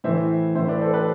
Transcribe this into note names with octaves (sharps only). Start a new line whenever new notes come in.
A2 E3 C5 E5
A2 E3 C5 E5
B4 D5
A4 C5
G4 B4